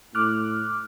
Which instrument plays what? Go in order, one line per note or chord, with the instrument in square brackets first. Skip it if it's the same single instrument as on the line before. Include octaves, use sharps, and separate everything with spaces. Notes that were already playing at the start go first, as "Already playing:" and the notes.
[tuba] A2 [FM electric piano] D6 F6 F#6